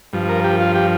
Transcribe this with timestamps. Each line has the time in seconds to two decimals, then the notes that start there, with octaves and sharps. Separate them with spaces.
0.13 G2 F3
0.29 A#4
0.44 G4
0.61 F4
0.75 G4